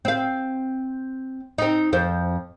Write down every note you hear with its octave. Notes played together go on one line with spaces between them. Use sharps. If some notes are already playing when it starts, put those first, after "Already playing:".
C4 F5
C4 D#4
F2 C5